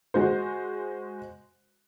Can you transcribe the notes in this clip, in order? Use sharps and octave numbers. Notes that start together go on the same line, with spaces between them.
G#3 F#4 C5